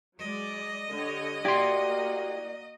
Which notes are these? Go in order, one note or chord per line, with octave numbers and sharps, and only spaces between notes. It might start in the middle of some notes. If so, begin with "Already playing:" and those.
F#3 G#3 D5 D#5
D3 G4 C#5
A#3 E4 F#4 G4 D5 C6